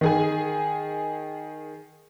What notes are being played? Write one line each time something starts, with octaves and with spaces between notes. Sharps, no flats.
D#3 G#4 G#5